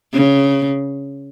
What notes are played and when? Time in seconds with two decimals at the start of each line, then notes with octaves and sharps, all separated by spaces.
0.13 C#3